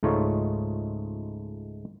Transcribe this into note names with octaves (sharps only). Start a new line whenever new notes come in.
C#2 G#2 A3 D#4 F4 C#5